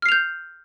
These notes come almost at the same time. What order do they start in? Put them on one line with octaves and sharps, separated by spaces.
F6 C7 F7 G6